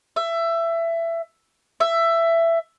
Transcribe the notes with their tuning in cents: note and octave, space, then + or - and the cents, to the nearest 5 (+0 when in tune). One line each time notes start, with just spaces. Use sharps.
E5 +20
E5 +15